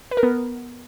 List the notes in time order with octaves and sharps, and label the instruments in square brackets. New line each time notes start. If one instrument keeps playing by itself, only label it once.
[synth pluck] B4
A#4
B3